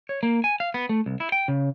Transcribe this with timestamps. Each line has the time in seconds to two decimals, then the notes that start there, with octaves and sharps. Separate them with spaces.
0.09 C#5
0.23 A#3
0.44 G#5
0.60 F5
0.74 B3
0.89 A3
1.06 C2
1.20 E4
1.32 G5
1.48 C#3